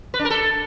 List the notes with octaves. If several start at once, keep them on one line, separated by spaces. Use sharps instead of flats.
B4
D4
A#4
A4